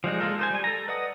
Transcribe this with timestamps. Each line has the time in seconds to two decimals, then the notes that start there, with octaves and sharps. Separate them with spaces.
0.04 F3 G3 G#3 D#4
0.20 G#3 A#3 F4 A4 A#4
0.39 D#4 C5 G#5
0.51 G3 G#5
0.64 A4 A#5
0.88 B4 D5 D#5 F#5 D#6